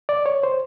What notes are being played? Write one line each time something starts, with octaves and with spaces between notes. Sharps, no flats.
D5
C#5
C5